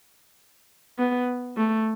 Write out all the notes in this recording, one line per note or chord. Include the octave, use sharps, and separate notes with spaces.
B3
A3